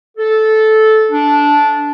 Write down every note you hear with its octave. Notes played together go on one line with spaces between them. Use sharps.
A4
D4